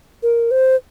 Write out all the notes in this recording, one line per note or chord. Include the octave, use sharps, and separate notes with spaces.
A#4
C5